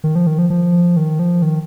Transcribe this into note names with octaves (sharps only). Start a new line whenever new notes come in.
D#3
F3
D#3
F3
F3
D#3
F3
D#3